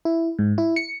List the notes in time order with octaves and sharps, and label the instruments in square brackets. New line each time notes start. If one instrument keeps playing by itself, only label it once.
[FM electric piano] E4
G#2
E4
C#7